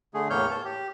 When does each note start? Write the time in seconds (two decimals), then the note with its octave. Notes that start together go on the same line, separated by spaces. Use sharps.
0.14 D3 A3 G#4
0.30 E2 A2 A#3 C#5 F6 G6
0.51 A5
0.65 G4